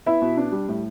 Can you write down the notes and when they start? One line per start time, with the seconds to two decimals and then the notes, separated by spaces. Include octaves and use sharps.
0.06 B3 E4 E5
0.22 B2
0.37 D4
0.52 G3
0.68 A2